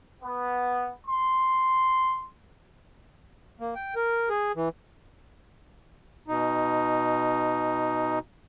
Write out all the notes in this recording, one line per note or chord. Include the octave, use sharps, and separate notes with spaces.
B3
C6
A#3
G5
A#4
G#4
E3
B2 D#4